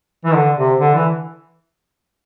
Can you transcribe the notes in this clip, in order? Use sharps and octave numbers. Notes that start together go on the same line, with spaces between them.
E3
D3
C3
D3
E3